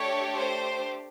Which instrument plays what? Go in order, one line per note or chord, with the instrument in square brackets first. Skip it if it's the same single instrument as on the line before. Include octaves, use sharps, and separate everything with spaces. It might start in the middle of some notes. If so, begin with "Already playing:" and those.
Already playing: [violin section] A3 D4 G4 C#5
C5